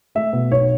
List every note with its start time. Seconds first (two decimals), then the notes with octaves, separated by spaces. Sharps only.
0.15 A3 E5
0.33 B2
0.51 B1 C#5